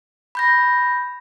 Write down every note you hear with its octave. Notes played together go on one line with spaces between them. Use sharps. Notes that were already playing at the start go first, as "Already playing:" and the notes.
B5 G6 A#6